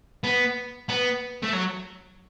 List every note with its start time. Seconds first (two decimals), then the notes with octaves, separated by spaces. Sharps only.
0.24 B3
0.89 B3
1.43 A3
1.53 F#3